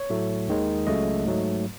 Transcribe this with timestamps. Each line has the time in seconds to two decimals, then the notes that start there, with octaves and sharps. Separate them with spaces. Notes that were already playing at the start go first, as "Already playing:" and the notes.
Already playing: C#5
0.10 A2 F#3 A3
0.48 D#2 D#3 G#3
0.87 C#2 C#3 F#3 A3 D#5
1.26 G#2 F#3 A3